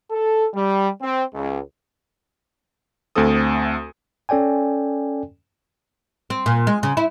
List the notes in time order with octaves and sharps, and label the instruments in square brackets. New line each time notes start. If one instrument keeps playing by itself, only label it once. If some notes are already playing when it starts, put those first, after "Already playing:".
[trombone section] A4
G3
C4
C#2
[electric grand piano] D2 A3 C4 A4 D#6
[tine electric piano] C#4 A4 D5 G5 G#5
[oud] C4
A#2
G#3
C#3
E4